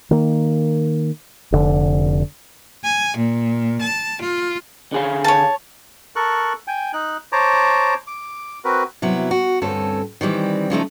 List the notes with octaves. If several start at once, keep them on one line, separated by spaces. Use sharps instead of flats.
D#3 A#3
F1 D3
G#5
A#2
A5
F4
D3 G#4 F5
C#5 A5
A4 A#4 C#6 F#6
G5 G#5
D#4 F#6
C5 C#5 A5 A#5 D6
D6
C4 F#4 A#4 B4
C3 F#3 B3 E4
F#4
D2 G2 C4 C#4 A4
D#3 E3 G3 C4
C#3 F3 A3 D#4